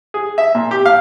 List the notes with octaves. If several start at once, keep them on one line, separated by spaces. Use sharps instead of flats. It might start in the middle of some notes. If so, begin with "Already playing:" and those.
G#4
E5
A#2
G4
F5